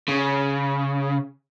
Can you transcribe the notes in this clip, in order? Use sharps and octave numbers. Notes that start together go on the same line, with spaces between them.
C#3